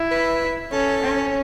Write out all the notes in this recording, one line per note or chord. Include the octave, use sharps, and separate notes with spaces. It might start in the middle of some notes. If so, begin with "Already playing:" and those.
Already playing: E4
B4
C#4 A4
C#4